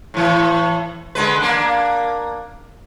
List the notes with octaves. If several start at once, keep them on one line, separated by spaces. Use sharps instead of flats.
A2 E3
D3 G#3 B4
A#3 D4